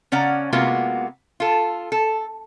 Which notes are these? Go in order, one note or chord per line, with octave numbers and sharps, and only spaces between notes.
C#3 C#4 D5 F#5 A#5
C3 G#3 A#3 B3 F4 F#4
F4 A4
A4